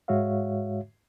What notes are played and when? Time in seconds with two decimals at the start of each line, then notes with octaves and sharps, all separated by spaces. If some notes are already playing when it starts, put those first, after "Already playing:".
0.08 G#2 G#3 F#4 C#5 E5 F5